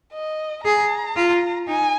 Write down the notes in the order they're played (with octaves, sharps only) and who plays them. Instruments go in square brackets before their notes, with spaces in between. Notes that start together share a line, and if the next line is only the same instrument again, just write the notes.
[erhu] D#5
[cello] G#4 [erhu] A#5
[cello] F4
[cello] D#4 [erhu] G#5